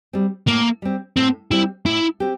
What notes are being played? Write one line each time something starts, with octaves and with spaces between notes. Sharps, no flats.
G3 C4
A2 A#3
G3 C4
A2 C4
G3 C4 E4
A2 E4
C4 G4